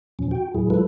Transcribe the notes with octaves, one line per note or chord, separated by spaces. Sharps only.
E2 A#2 F3 C#4
F#4 G5
E2 A2 F#3 E4 G#4
F#3 G#3 E4 F4 A4 B4